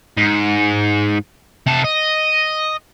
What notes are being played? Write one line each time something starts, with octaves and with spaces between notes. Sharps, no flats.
G#2
C3 A5
D#5